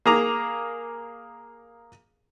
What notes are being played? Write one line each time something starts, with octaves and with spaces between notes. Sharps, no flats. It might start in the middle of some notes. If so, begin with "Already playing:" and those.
A#3 G#4 A#5 D6